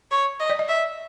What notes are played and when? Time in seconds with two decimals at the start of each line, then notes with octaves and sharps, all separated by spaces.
0.11 C#5
0.40 D#5
0.50 D5
0.59 D#5
0.69 E5